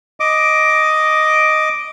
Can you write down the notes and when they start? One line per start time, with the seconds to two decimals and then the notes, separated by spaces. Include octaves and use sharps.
0.20 D#5 D6